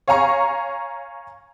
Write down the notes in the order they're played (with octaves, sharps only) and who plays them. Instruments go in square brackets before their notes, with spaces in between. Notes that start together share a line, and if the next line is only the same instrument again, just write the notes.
[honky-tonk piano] C#5 F5 G#5 A#5 C#6